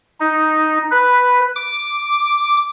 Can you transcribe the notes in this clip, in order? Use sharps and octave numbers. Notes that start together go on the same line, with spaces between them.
D#4
B4
D6